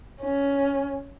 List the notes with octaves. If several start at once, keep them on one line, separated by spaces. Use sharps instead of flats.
C#4